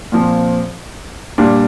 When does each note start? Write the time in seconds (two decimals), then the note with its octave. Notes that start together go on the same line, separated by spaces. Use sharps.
0.12 A#2 F3 C4
1.38 A#2 G3 D4